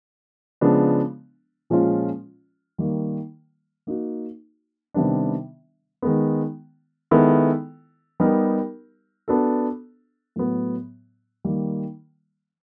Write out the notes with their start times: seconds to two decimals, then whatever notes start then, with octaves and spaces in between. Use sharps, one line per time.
0.61 C#3 F3 G#3 B3 D4
1.70 A#2 F3 G#3 C#4 F4
2.78 D#3 G3 A#3
3.87 A#3 D#4 F#4
4.94 C3 D#3 G3 B3 D4
6.02 D#3 G#3 B3
7.11 D#3 G#3 B3 E4 A4
8.20 G3 B3 D#4 G4 A#4
9.28 B3 D4 F#4 A4
10.36 A2 F#3 B3
11.45 D#3 G3 A#3